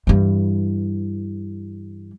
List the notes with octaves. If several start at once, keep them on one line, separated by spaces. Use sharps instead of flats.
G2 E3